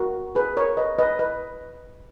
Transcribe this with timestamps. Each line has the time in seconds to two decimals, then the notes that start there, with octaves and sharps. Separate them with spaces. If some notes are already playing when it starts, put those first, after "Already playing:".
Already playing: F#4 A#4
0.35 G#4 B4
0.57 A#4 C#5
0.77 B4 D#5
0.98 B4 D#5
1.19 B4 D#5